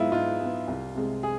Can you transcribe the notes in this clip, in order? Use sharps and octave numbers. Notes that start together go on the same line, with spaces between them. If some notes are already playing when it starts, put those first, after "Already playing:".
Already playing: G#2 G#3 B3 E4 F4 G#4
G#2 F4
G#3 B3
C2
C3 G#3
G#4